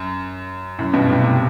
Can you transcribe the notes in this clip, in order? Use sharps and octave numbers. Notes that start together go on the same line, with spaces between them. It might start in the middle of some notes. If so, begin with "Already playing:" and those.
Already playing: F#2
F#2 A2
G2 B2
A2 C3
A2 C3